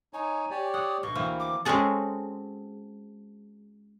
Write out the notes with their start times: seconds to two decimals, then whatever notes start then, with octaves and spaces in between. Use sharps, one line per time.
0.14 D#4 C#5 G#5
0.51 G4 C#5 D5
0.74 F#5 D#6
1.03 D2 B2 C#6
1.15 E3 A#3 C4
1.40 D6
1.65 G#3 C4 C#4 F#4 G#4 A4